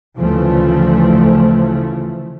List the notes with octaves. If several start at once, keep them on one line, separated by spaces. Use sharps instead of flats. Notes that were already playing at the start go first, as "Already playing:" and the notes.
D2 C#3 E3 F3 A3